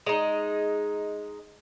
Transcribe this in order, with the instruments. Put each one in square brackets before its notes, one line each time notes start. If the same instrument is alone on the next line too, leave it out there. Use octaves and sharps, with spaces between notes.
[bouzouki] G#3 D#4